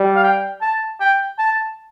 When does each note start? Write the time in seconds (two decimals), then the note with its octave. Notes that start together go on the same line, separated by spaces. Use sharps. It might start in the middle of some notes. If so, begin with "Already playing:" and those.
Already playing: G3
0.16 F5
0.23 G5
0.61 A5
1.00 G5
1.39 A5